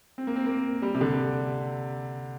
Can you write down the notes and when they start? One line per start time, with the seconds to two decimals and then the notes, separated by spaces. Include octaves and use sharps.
0.18 C4
0.27 A#3
0.36 C4
0.46 A#3
0.82 G3
0.94 C3
1.01 D3